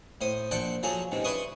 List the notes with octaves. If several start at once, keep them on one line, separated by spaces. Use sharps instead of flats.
A2 C5 D#6
A#1 A4 C5 D5 F#5
F3 F#3 G#4 A4 A#5
C#2 G#2 C3
E4 B4 D5 C6 C#6 D#6